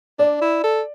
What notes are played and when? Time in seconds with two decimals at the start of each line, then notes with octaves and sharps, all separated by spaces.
0.19 D4 D5
0.41 E4
0.64 A4